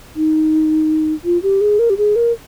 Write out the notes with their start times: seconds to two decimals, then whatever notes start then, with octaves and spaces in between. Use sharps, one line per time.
0.16 D#4
1.25 F4
1.43 G4
1.61 G#4
1.79 A#4
1.90 G4
1.97 G#4
2.16 A#4